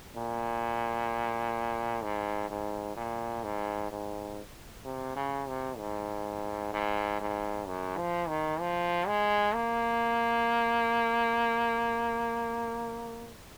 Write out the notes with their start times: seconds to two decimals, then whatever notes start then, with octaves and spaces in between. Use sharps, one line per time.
0.16 A#2
2.03 G#2
2.50 G#2
2.96 A#2
3.44 G#2
3.91 G#2
4.85 C3
5.16 C#3
5.48 C3
5.78 G#2
6.73 G#2
7.20 G#2
7.66 F#2
7.97 F3
8.28 D#3
8.60 F3
9.07 G#3
9.54 A#3